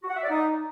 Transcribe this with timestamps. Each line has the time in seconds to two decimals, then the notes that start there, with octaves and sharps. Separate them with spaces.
0.02 F#4
0.09 F#5
0.16 E5
0.22 D5
0.29 D#4